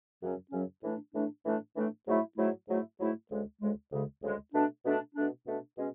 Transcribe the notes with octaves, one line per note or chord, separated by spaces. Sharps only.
F#2 C#3 F#3 C#4
F#2 C#3 F#3 C#4
A2 E3 A3 D4
A2 E3 A3 D4
A2 E3 A3 D4
A2 E3 A3 D4
G#2 F#3 A3 E4
G#2 F#3 A3 E4
G#2 F#3 A3 E4
G#2 F#3 A3 E4
D2 C#3 G#3
D2 C#3 G#3
D2 C#3 G#3
D2 C#3 G#3
B2 A3 D4
B2 A3 D4
B2 A3 D4
B2 A3 D4
B2 G#3 C#4